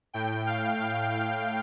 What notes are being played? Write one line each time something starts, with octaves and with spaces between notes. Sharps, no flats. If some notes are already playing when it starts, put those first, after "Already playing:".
A2 G5
F5
F5
F5